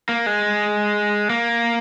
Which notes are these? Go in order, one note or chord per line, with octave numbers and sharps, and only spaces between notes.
A#3
G#3
A#3